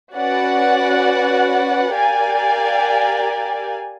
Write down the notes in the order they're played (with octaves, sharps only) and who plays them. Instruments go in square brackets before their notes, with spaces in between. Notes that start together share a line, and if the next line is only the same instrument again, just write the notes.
[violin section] C#4 F#4 B4 D5 F#5
G4 A#4 D5 F5 G#5